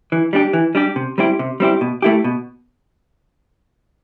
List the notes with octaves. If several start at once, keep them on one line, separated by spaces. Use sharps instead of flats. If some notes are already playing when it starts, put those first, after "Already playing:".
E3
G3 D4 G4
E3
G3 D4 G4
C3
G3 C4 E4 G4
C3
G3 C4 E4 G4
B2
A3 E4 G4
B2